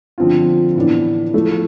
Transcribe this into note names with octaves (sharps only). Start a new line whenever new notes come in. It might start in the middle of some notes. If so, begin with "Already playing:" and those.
D3 F3 C4 F4
A2 E3 B3 D4
F3 A3 E4